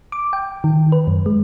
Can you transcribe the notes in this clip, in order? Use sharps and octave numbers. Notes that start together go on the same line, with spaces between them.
D6
G5
D#3
B4
F#2
G#3